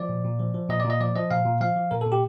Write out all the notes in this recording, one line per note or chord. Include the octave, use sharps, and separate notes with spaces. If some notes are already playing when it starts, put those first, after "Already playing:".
Already playing: F3 D5
A#2
A#2
F3
F3
A#2 D#5
D5
A#2
D#5
F3 D5
F3 D#5
A#2 F5
A#2
F3 F5
F3
A#2 A#4
A#2 A4
G4